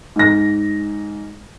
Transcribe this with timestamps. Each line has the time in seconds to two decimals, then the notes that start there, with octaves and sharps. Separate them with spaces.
0.16 G#2 A#6